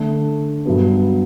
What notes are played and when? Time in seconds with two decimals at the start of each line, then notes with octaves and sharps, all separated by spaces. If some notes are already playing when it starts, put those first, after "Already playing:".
Already playing: D3 A3 D4
0.66 G2 F#3 B3